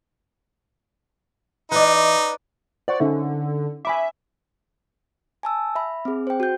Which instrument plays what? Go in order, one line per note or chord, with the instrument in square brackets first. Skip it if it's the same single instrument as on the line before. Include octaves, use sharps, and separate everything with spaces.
[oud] E3 D#5 [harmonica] D#4 [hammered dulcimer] B4 D5
[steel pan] C5 F#5 C#6 [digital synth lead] D5
[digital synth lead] D3 [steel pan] C#4 D#4 E5
[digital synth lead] E5 [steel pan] G#5 B5 D6
[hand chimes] G#5 A5 E6
E5 B5
C4 G#4
C5 G5
F#4 G6